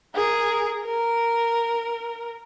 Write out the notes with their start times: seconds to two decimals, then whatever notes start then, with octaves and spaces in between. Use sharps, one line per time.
0.15 G#4 A#4
0.85 A#4